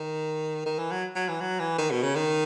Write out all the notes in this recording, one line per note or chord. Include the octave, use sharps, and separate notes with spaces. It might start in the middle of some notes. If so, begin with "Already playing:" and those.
Already playing: D#3
D#3
E3
F#3
F#3
E3
F#3
E3
D#3
B2
C#3
D#3